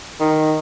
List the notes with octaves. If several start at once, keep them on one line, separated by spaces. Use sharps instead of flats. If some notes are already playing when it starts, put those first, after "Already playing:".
D#3